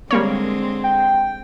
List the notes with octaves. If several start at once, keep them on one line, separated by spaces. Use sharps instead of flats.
D3 G3 G#3 A#3 C4 C#5
G5